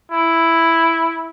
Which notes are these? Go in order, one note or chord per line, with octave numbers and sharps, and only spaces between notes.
E4